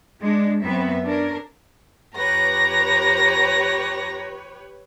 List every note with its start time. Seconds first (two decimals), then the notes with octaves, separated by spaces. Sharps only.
0.20 G#3 D4
0.62 F#2 B3 C4 E5
1.03 C#4 D4 A#4
2.17 F2 G4 B4 C#5 A#5 A#6